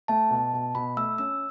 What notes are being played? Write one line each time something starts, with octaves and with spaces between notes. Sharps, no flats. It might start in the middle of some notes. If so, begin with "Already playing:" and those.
A3 A5
B2
B2
B2 B5
A3 E6
C#4 E6